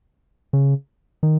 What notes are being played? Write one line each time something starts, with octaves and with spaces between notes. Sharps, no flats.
C#3
D#3